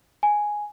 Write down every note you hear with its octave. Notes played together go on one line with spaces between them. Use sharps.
G#5